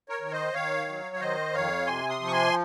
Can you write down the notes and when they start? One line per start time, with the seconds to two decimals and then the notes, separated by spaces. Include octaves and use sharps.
0.09 A#4 C#5
0.21 D#3
0.31 C5 D#5
0.53 D#3 C#5 F5
0.88 F#3
1.15 F5
1.20 D#3 C5 D#5
1.53 F2 C#5 F5
1.87 C3 G#5 C6
2.09 C6 D#6
2.20 F3
2.27 C#6
2.32 G#5 C6